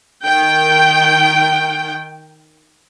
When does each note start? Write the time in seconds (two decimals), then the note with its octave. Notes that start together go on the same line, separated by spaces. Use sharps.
0.25 D#3 G5